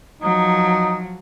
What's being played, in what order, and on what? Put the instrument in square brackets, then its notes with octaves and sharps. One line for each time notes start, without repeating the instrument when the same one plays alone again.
[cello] F3 F#3 [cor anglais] D#4